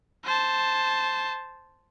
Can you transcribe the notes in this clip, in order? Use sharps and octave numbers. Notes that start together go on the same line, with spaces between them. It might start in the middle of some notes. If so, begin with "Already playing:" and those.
C5 A5